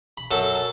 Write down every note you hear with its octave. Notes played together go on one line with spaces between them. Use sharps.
B5
F#2 A4 A5
A5